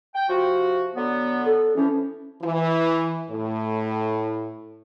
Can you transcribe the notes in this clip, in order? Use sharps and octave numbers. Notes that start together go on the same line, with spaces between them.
G5
C3 F3 F#4
D3 F#3 B3
A4
E3 F3 C#4
E3
A2